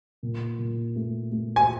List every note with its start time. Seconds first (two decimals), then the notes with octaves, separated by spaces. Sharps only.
0.23 A#2
0.59 A#2
0.96 A3
1.32 A3
1.56 G#5